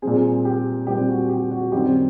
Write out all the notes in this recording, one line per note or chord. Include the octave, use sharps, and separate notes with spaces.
A#2 G3 C4 G#4
G4
A#2 G3 C4 G4
F#4
G4
F#4
F#2 D#3 G3 C4 G4